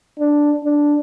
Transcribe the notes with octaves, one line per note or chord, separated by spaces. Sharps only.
D4
D4